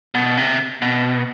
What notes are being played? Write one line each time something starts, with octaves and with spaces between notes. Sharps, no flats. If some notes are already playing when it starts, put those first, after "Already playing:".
B2
C3
B2